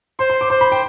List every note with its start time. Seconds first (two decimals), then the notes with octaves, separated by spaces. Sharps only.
0.19 C5 C6
0.30 C6
0.41 D6
0.50 C5 C6
0.61 B5
0.72 G5